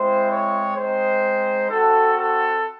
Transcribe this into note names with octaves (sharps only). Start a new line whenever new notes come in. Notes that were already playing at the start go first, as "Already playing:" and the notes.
Already playing: G#3 C4 E4 C5
C#5
G#3 C4 D#4 C5
C4 F#4 A4
A4